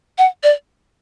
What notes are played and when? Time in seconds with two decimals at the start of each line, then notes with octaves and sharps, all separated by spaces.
0.18 F#5
0.43 D5